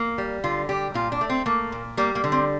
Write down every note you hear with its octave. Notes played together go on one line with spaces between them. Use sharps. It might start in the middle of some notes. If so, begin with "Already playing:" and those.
Already playing: A#3
G3
D3 F4
G3 G4
A#2 F4
D4
A3
C4
A3 A#3
A#2
G3 A#3
A#3
D3
C4